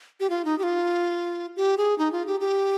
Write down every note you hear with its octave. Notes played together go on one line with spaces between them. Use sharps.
G4
F4
D#4
G4
F4
G4
G#4
D#4
F4
G4
G4